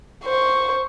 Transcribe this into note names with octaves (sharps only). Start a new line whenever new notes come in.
C5 C#6